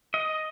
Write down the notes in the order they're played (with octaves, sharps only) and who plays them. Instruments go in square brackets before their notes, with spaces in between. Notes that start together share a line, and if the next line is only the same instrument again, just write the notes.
[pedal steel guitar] D#5